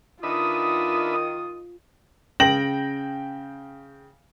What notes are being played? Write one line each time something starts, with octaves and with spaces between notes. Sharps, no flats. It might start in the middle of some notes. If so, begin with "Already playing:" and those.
D#3 D4 F4 B4 E5 D#6
C#3 G5 A#6 F#7